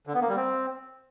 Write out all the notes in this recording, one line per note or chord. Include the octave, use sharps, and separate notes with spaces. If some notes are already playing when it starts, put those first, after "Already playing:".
D3
B3
A#3
G3
C4